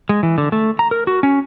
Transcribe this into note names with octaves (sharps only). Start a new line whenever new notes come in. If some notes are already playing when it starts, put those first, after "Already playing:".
G#3
E3
D3
A3
A#5
A#4
F#4
C#4